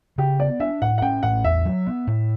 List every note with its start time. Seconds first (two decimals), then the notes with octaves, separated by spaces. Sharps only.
0.18 C#3 G4
0.39 B3 D5
0.60 D4 E5
0.82 A2 F#5
0.98 F#5
1.02 C#4 G5
1.23 A2 F#5
1.44 E2 E5
1.65 F#3
1.86 B3
2.07 A2